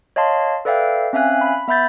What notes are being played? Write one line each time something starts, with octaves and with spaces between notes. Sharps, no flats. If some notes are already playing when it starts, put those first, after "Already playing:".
C#5 D#5 F5 A5 C6
A4 B4 D5 E5 F5 G5
C4 C#4 E5 F5 G#5 F#6
B5
B3 E5 B5 G6 A6